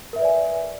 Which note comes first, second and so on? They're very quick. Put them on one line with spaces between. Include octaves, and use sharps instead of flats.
A#4 E5 B4 D5 G#5